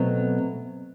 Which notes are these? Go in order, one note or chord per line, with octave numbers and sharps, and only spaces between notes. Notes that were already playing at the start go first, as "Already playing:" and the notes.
Already playing: B2 F#3 A3 C4